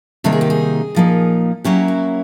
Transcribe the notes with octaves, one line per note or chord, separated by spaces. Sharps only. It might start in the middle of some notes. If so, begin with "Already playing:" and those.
C3 D#3 G3 A#3 D#4 A4
G#4
G4
G#4
A#2 F3 A#3 D#4
F#3 A#3 C#4 E4 G4
F#4